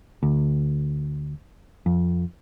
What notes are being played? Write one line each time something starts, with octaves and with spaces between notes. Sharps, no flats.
D2
F2